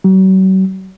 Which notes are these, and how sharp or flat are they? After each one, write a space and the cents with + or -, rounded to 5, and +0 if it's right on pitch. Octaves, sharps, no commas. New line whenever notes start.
F#3 +40